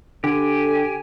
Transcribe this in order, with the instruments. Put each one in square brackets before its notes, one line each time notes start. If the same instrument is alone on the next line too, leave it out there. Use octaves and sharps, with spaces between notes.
[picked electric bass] D3 [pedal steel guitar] G4 [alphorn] A4 [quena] G#5